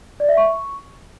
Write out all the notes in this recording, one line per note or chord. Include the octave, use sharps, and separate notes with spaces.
D5
E5
C#6